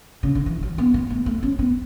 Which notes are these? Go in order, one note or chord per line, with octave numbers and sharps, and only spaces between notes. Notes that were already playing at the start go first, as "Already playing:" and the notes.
C#3
D3
E3
F#3
B3
B3
A3
A3
C#4
B3